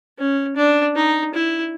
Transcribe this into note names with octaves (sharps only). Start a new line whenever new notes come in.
C#4
D4
D#4
E4